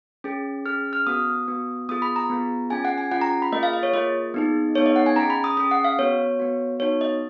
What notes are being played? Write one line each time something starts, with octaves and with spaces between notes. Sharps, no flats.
C#4 G#4
C#4 G#4 F6
F6
B3 F#4 D#6
B3 F#4
B3 F4 G#4 D#6
B5
A#5
B3 F4 G#4
C#4 F4 G#4 G#5
F#5
G#5
C#4 F4 G#4 F#5
A#5
B5
A#3 F4 G#4 D#5
F5
D#5
C#5
A#3 F4 G#4 D#5
B3 D#4 G#4
B3 D#4 G#4 C#5
D#5
F#5
G#5
C#4 G#4 A#5
B5
D#6
C#4 G#4 D#6
F#5
F5
B3 F#4 C#5
B3 F#4
B3 D#4 F#4 C#5
D#5